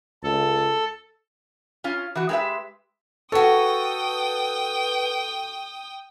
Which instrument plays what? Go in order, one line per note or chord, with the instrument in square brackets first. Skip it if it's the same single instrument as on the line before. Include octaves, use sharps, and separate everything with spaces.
[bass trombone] C#2 [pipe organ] A4
[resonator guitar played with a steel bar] C#4 F4
E3 F#4
G#3 G4 G#4 B4 E5
[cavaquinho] F#4 C#5 [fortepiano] A4 [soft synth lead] B4 [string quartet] G5 D#6